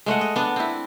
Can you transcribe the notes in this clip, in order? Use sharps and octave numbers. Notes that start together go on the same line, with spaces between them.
G#3 A3 D#5 F#5
D#5
B3 D4
C4 E4